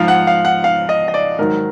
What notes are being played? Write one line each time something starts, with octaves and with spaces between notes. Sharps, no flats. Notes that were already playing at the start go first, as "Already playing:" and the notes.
Already playing: G#2 F3 F5
F#5
F5
F#5
F5
D#5
D#5
D5
G#2 D#3 F#3 A#4